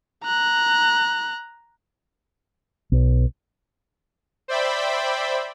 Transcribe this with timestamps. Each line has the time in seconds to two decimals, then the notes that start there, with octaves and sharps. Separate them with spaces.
0.24 A#5 F#6
2.92 B1
4.48 C5 D5 E5 G5 B5